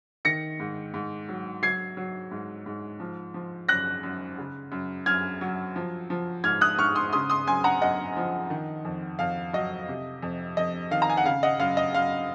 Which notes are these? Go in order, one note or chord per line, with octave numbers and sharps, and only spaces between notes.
D#3 A#6 C#7
G#2
G#2
F#3
F#3 G#6 C7
F#3
G#2
G#2
F3
F3
F#2 F#6 A#6
F#2
C#3
F#2
F#2 F6 G#6
F#3
F3
F3
G#2 F6 G#6
D#6 F#6
G#2 C#6 F6
C6 D#6
C#3 C6 D#6
C6 D#6
F#2 G#5 C6
F#5 A#5
F#2 D#5 F#5
F3
D#3
F2
F2 F5
F#3 D#5
C3
F2
F2 D#5
D#3 F5
A#5
G#5
F#5
C#3 F5
D#5 F#5
F#2 F5
D#5
F#2 F5